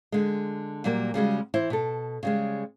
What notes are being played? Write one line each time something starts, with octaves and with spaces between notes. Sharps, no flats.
D3 G#3
A#2 F#3 G3 A#3
C#3 G3 G#3 F#4
E3 E4 C5
B2 A4
C#3 G3 G#3